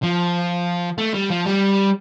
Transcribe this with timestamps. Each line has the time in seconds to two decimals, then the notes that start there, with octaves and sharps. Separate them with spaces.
0.03 F3
0.98 A3
1.14 G3
1.30 F3
1.46 G3